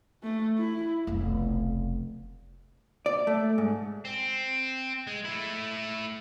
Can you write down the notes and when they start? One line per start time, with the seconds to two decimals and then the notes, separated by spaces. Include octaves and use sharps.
0.23 A3
0.58 E4
1.07 F1 B1
3.06 D5
3.27 A3
3.58 G#2
4.05 C4
5.07 G#3
5.25 A3 E4